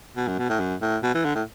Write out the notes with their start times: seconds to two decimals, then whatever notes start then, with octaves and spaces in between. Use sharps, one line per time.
0.16 B2
0.27 F#2
0.39 B2
0.49 A2
0.60 F#2
0.82 A2
1.03 B2
1.14 E3
1.25 D3
1.35 A2